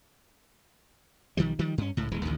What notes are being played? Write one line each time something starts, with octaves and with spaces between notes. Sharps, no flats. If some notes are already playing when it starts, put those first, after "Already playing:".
B1 D#3 F3 G3
D#3 F3 G3
G2 C#4
C#2 A2
D#1 E3 G#3
A1 D2 D#3